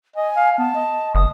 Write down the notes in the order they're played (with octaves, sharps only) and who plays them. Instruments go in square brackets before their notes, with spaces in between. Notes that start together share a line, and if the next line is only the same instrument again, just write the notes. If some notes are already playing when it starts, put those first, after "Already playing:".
[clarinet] D#5 [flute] G#5
[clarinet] F5
[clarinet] B3 [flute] A5
[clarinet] D#5
[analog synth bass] F#1 [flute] D#6